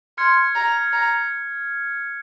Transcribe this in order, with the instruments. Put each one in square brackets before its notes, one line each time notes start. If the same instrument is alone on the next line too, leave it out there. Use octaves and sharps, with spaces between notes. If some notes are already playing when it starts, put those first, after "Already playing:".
[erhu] C6 [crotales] F6 G#6 C#7
[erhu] A#5
A#5